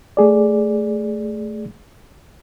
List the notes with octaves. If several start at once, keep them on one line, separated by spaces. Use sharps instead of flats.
A3 G#4 D5